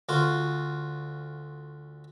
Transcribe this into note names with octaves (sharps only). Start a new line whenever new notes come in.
D2 F4 F#4